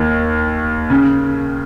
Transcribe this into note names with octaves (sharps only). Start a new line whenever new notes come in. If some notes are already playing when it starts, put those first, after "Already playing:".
Already playing: D#2 D#3
C#3